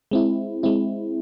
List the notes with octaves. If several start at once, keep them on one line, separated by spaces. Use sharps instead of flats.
G#3 C4 E4
G#3 C4 E4